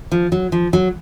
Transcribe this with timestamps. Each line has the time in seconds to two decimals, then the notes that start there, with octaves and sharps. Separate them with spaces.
0.12 F3
0.32 F#3
0.52 F3
0.73 F#3